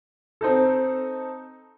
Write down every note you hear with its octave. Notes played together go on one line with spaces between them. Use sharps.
C4 D#4 A4